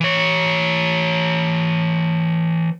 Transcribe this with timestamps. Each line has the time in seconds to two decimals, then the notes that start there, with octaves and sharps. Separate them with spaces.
0.01 E3 C#5